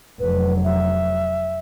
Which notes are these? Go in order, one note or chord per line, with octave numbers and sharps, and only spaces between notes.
F1 F#3 B4
E5